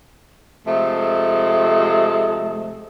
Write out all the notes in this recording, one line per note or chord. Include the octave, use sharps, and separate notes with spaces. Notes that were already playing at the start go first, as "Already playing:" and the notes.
C3 F3 G#3 A3